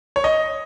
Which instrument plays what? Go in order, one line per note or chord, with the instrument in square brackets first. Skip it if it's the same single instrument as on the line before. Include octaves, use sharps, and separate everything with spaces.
[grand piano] C#5
D#5